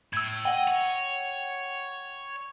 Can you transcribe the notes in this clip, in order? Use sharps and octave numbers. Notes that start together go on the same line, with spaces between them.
A2 E6 G#6
D#5 F#5 G5
C#5